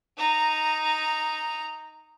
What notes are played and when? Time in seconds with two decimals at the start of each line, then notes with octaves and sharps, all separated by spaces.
0.18 D#4 A#5